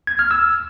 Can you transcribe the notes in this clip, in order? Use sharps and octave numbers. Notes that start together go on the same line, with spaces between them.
G#6
F6
E6